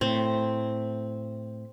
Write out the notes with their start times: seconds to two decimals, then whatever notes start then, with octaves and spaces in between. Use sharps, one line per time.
0.01 A2 C4